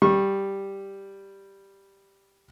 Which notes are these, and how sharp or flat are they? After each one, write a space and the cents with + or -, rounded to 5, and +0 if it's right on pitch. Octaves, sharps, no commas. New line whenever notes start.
G3 +0 C#6 -25